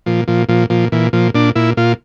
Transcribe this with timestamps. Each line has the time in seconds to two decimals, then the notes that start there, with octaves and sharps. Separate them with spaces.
0.06 A#2 F3
0.28 A#2 F3
0.49 A#2 F3
0.70 A#2 F3
0.92 A#2 E3
1.13 A#2 F3
1.34 A#2 D4
1.55 A#2 E4
1.77 A#2 F4